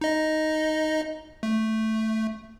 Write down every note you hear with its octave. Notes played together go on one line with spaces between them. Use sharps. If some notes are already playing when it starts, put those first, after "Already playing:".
D#4 D#5
A3